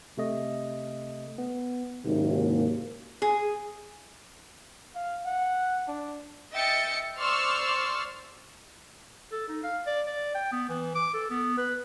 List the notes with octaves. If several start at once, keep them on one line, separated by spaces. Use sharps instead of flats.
C3 A3 D#5
B3
F#1 D#2 G#2 C3
G#4
F5
F#5
D4
D#5 E5 G5 A6 C#7
C5 D5 C6 C#6 E6 F6
A4
D#4
F5
D5
D5
G5
B3
E3
D6
A4
B3
B4